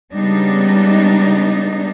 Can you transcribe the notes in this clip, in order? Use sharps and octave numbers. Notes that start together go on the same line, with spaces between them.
C#3 G3 G#3 B3 D4 D#4